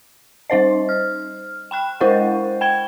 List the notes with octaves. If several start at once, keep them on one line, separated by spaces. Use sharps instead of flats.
G3 D#4 C5 D#5
F6
G5 B5 F#6
G#3 E4 A#4 C5 D#5 F#5
G5 B5 G#6 G7